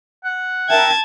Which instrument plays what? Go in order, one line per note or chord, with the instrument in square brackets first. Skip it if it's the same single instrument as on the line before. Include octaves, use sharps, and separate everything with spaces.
[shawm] F#5
[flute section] A#4 E5 G5 [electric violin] A5 G#6